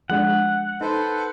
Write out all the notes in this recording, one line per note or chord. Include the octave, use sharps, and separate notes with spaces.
F3 G#3 D4 F#5
D#4 A4 B4 C5